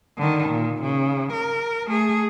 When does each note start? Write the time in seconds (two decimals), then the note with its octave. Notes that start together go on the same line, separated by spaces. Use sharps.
0.17 D3 D#3
0.50 A#2
0.82 C#3
1.33 A#4
1.87 A3 G#4